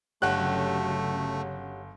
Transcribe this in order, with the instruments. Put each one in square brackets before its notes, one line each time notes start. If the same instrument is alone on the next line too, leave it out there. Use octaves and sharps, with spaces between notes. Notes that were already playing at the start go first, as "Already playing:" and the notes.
[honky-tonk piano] G1 F#6 [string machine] C#3 F#3 [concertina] A3 [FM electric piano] G4 C#5 F#5